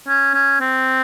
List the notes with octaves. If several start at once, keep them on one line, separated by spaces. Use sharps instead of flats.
C#4
C#4
C4